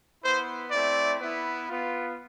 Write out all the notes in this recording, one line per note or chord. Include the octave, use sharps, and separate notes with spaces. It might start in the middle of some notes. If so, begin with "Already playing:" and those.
B3 E4 C5
A3 C4 E4 D5
B3 E4
B3 F4